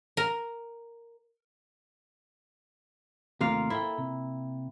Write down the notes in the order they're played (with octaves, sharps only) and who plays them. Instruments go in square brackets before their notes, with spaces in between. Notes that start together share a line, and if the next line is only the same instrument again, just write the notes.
[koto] A#4
[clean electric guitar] D#2 C3 A3 [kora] A#3 F4 F5
[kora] E4 [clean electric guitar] A4 G5
[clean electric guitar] C3